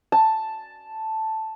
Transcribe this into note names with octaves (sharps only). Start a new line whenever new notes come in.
A5